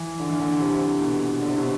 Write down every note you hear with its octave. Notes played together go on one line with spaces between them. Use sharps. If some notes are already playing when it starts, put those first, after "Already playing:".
Already playing: E3
D3
E3
D3
C3
B2
D3
C3
B2